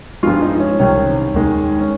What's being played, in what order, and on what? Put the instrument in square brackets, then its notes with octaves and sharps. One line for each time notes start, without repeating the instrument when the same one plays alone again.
[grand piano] G2 F3 G#3 F4
D#4
C#4
C2 C3 D#3 C#4
D#2 D#3 G#3
C#4